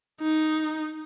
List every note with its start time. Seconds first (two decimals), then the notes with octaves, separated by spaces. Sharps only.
0.21 D#4